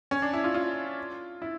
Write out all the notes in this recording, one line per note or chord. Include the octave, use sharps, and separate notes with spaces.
C#4
D4
E4
F4
F4
E4